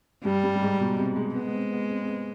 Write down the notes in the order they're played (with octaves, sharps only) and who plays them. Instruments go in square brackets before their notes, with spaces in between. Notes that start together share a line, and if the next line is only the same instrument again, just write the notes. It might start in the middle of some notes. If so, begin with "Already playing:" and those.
[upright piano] G2 [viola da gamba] G3
[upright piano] G2
G2
G#2
B2
C3
G#3
[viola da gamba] G#3 [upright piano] B3
[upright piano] B3
C4
B3
C4
C4
B3